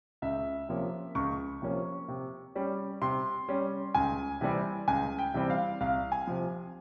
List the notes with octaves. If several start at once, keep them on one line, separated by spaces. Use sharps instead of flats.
C#2 E5
C3 F3 A#3 C#4
C#2 C#6
C3 F3 A#3 C#4
C3
G3 C#4
C3 C6
G3 C#4
C#2 G#5
C3 E3 G3 C4
C#2 G#5
G5
C3 E3 G3 C4
F5
C2 F5
G#5
C3 F3